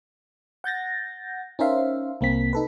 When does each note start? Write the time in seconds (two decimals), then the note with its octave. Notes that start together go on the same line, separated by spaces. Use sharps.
0.64 F#5 G6 A6 A#6
1.59 C#4 D#4 A#4 C5 E5 F5
2.21 C2 A#3 C4 B6
2.53 D#4 A4 B4